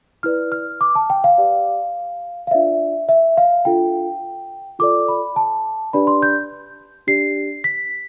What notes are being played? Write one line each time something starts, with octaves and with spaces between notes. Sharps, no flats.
E4 B4 D5 F6
F6
D6
A5
G5
F5
G4 B4 D5
F5
D4 F4 B4 D5 E5
E5
F5
D4 F4 A4 G5
F4 A4 D5 D6
B5
A5
D4 G4 B4 D5 B5
C6
G6
D4 G4 D5 C7
B6